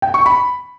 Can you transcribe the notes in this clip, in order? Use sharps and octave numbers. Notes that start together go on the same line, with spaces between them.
G5
C#6
B5